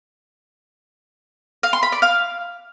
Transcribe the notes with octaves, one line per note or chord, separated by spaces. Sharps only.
F5
C6
B5
D5
F5